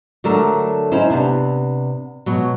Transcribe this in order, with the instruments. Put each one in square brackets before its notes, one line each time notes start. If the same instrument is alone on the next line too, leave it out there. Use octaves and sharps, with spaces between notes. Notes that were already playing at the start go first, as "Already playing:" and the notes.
[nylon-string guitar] D3 F#3 A3 D4 A4 A#4
C#4 D#4 E4 C5
C3 B3 D4
B2 F#3